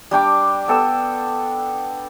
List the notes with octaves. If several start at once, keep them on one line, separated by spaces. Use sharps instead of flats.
G3 D4 G5 D6
B3 A4 G5 E6